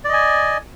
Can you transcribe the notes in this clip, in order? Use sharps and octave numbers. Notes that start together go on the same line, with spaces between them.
D5 D#5 G#5